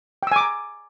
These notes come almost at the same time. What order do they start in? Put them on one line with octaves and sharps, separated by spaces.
G5 E6 G#5 D6 A#5